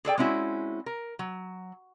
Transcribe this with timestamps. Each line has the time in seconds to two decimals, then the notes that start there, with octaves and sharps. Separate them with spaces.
0.05 G#4 A4 D5 G5
0.18 G#3 C4 C#4 E4 F#4
0.86 A#4
1.19 F#3